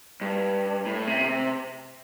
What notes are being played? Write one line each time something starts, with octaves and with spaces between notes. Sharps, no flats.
G2
A2
C3
C3